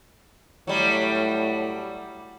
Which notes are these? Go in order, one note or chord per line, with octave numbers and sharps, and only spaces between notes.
A2 F#3 G3